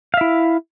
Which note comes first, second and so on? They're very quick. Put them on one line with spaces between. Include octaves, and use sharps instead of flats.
F5 E5 E4